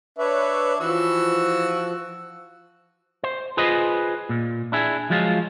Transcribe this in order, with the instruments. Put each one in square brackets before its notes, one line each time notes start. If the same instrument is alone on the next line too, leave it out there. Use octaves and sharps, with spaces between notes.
[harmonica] D4 [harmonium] B4 C#5 E5
[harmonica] E3 F#4 E6 [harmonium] F3
[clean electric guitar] C5
F4 G#4 B4 C5 D#5
A#2
D4 E4 G#4
F3 F#3 G#3 F4